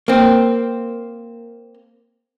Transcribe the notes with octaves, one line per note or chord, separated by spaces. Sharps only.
A#3 C4